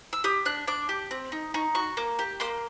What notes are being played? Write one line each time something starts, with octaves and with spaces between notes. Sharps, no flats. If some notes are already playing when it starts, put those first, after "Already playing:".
E6
G4 D#6
D4 F#6
D4 D6
G4
C4
D#4
D#4 C#6
F#4 C#6
A#3
G4
A#3 C6